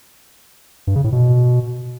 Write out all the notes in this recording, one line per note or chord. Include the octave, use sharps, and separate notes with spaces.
G2
C#3
A2
B2